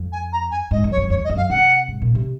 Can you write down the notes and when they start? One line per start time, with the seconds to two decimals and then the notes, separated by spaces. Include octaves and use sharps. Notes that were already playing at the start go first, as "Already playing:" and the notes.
Already playing: F2
0.12 G#5
0.32 A#5
0.51 G#5
0.71 G#2 D#5
0.84 F#2
0.91 C#5
0.97 F#2
1.10 F2 C#5
1.24 D#5
1.30 F#2
1.37 F5
1.49 C3 F#5
1.88 G#2
2.02 A#2
2.15 C3